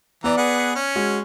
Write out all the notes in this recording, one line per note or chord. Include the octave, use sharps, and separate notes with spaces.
E3 B3 D5 A#5
G#4 B4 F#5
C#4
G#3 F#4